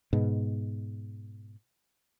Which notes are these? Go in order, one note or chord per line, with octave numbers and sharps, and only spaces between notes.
G#2 B2